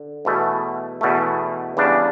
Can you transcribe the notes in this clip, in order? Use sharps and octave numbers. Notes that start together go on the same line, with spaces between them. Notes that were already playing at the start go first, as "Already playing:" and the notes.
Already playing: D3
E2 B2 A3
E2 B2 A3
E2 C#3 G3 D4